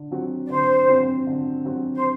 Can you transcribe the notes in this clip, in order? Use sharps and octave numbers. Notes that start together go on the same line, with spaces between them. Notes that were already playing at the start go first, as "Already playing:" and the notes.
Already playing: D3
F#3 C4 F#4
D5
D3 C5
F#3 C4 F#4
D3
F#3 C4 F#4
C5